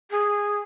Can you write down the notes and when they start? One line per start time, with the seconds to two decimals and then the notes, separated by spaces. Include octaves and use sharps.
0.11 G#4